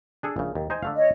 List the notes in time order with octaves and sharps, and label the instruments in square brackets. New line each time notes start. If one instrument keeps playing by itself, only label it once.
[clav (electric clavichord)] D4 G#4 A4
A#1 C#3
D#2
D#4 C5 G#5
D3 A3 F5
[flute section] C#5 D#5